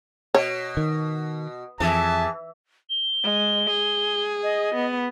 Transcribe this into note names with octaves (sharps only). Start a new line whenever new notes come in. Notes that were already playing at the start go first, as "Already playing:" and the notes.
B2 C#5
D#3
F2 E3 G#4 E5 A5
G7
G#3
G#4
D#5
B3